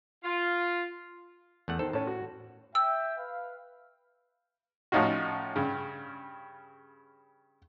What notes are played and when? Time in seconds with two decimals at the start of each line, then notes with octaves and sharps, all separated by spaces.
0.24 F4
1.68 E2 A3 F#5
1.79 D#3 A4 C5
1.93 A2 C#4 A5
2.07 F#4
2.75 E5 G5 E6
3.18 B4 F5
4.92 A2 F3 C#4 D#4 F4 F#4
5.56 G2 C#3